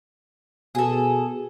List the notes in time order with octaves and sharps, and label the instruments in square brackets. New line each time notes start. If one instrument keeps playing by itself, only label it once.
[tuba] B2 [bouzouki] G#4 A4